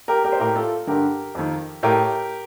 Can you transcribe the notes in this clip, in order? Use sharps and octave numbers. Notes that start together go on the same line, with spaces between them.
G4 A#4
G4 A#4
C5
A2 G4 A#4
F4 A4
G2 D3 G4 A#4
F2 D#3
A2 G4 A#4